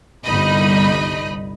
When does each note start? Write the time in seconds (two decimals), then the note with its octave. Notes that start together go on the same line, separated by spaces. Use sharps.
0.24 G1 C2 D#4 D#5 B5